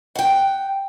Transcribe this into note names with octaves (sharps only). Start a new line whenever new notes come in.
F#5 G5